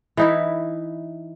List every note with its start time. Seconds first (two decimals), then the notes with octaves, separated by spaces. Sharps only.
0.17 E3 D#4 E4